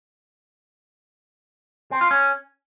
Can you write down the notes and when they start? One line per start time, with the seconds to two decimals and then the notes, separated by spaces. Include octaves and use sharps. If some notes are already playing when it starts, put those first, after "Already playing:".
1.91 C4
2.01 F4
2.11 C#4